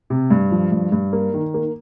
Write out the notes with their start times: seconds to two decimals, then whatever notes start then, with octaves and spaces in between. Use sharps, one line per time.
0.10 C3
0.31 G2
0.51 F3
0.72 G2
0.92 G2
1.13 A#3
1.34 D#3
1.54 A#3